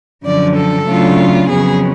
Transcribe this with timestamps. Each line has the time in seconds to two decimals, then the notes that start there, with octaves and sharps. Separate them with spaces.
0.25 F#2 D3 F3 D5
0.56 A4
0.87 C#3 F#3 A3 D4 F4
1.49 F2 C#3 F#3 B3 G#4